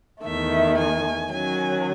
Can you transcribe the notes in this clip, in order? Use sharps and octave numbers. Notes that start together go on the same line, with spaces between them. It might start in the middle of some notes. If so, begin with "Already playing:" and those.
E2 D#3 A3 E5
G#5
D#3 F#3 C#4 G#5